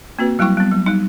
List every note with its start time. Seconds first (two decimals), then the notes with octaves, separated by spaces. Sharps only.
0.19 A#3 C4 F#4 B4
0.39 F#3 G3 E4 G5 C#6
0.57 G3 B3
0.71 F#3
0.86 G3 D#4